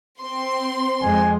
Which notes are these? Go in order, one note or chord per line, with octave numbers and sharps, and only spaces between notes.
C4 C6
F2 G#3 G#5